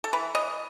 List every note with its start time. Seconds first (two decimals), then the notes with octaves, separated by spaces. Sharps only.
0.04 A4
0.13 E3 B4
0.35 E3 D#5